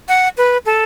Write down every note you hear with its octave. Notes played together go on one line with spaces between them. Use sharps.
F#5
B4
A4